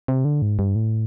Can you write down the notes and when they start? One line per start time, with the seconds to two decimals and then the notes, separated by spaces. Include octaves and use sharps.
0.08 C3
0.25 D3
0.42 G#2
0.59 G2
0.75 A2